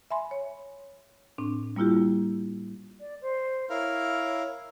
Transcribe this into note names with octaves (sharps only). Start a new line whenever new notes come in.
E5 G#5 B5 C6
C#5
A2 C4 D4
G3 A#3 E4 F4 G4
D5
C5
E4 A#4 C#5 F5